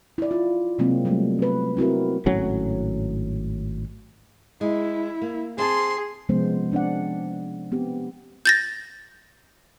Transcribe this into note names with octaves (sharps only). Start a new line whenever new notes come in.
E4 D5
F4
C3 F#3 G#3 A#3 C4
F#3 G3 A3 A#3
B3 B4
C4 E4 F#4 A#4
G#1 A2 F#3 C#4
G#3 E4
A#3
C4 G#4 F5 A5 C6
C3 F3 G#3 B3 C#4 C5
C4 D4 D5 F#5
B3 C4 G4
G6 A6 A#6